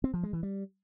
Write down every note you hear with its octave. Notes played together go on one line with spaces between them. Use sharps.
C4
F3
G#3
E3
G3